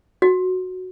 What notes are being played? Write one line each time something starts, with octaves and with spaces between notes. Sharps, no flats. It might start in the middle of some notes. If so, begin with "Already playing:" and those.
F#4